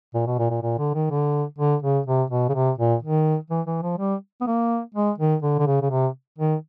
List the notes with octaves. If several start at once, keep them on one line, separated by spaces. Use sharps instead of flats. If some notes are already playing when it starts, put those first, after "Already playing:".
A#2
B2
A#2
A#2
A#2
D3
D#3
D3
D3
C#3
C3
B2
C#3
C3
A#2
D#3
E3
E3
F3
G3
B3
A#3
G#3
D#3
D3
D3
C#3
C#3
C3
D#3